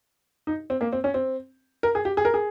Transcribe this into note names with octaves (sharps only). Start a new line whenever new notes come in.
D#4
C4
A#3
C4
C#4
C4
A#4
G#4
G4
G#4
A#4
G#4